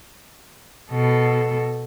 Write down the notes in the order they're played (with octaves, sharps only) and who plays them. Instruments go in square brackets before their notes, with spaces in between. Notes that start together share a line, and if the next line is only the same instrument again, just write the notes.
[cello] B2 A4